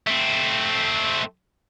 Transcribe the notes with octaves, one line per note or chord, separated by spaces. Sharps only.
A3 C4